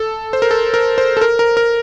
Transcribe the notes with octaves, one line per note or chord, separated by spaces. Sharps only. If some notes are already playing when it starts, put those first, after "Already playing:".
Already playing: A4
C5
A#4
A4
A#4
C5
A4
A#4
A#4
A#4